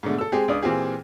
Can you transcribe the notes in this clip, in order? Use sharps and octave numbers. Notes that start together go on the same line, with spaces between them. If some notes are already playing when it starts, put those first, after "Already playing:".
G#2 B2 D3 A3
A4 E6
G#3 C4 G4 G#4
C#2 D4 D#6
A#2 E3 C4 F4 G4 G#4